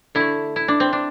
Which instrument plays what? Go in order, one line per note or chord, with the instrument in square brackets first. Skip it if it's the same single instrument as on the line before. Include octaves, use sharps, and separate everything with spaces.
[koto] D3 A3 E4
E4
D4
C4
D4